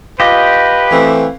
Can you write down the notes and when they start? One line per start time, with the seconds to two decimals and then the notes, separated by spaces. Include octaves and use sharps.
0.20 F4 G4 B4 D#5
0.91 E3 A3 C4